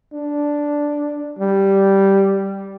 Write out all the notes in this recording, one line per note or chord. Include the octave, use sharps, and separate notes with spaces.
D4
G3